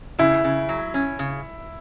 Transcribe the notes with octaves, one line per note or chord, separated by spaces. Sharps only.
C#3 E4
C#3
F#3
C#4
C#3